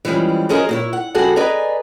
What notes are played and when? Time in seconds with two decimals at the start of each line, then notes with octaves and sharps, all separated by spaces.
0.05 E3 F3 G3 G#3 C#4
0.49 F#3 C#4 G#4 A#4 C5 D#5
0.69 A#2 E4 C#5
0.93 F#5
1.15 C#3 G3 F#4 G#4 A4 F#5
1.36 G#4 B4 D5 D#5 G#5 A#5